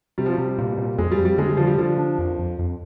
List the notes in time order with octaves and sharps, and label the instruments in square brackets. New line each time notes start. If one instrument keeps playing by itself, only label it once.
[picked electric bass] C3 [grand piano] G3
[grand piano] F3
[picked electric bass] C3 [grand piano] G3
[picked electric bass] A#2
A#2
[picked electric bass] F2 [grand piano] G#3
[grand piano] G3
[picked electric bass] F2
[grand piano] G3
[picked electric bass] D3 [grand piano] G#3
[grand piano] G3
[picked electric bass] D3 [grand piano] F3
[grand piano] G3
[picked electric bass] D3 [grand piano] F3
[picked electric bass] D4
F2
F2
F2